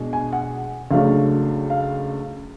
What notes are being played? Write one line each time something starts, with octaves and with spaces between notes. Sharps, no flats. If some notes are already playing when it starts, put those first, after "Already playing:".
Already playing: B2 G#3 D4
G#5
F#5
C#2 C#3 F#3 A3 D4 F5
F5